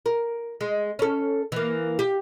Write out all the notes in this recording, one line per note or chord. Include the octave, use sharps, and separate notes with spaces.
A#4
G#3
C#4 A4
E3 A#3
G4